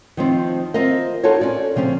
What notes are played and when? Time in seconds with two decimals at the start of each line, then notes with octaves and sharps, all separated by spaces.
0.17 D#3 F3 C4
0.74 C4 F4 A#4 D#5
1.23 D#4 F4 F#4 A4 A#4 C#5
1.41 C#4 D5
1.76 C#3 F3 C4 C#4